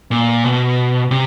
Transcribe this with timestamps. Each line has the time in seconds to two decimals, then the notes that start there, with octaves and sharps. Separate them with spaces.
0.11 A#2
0.44 B2
1.11 C3